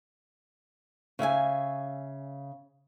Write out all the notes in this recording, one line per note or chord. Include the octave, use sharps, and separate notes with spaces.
C#3 E5 F#5 G#5